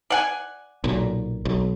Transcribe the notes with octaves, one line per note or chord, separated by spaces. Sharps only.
D5 F#5 G#5
B1 A#2
B1